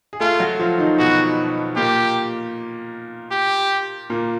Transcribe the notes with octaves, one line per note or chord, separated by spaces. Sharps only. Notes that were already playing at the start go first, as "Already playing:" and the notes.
G#4
A3 F4 A4
F#3 F#4
F3 F4
D#3 D#4
B2 B3 F#4
A#2 A#3 G4
G4
A#2 A#3